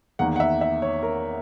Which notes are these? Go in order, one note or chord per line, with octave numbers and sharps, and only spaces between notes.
E2 D#3 A#3 F#5
F#5
E5
E5
C#5
A#4